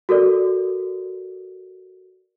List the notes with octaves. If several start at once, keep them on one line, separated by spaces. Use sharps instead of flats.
F#4 A4 A#4 D5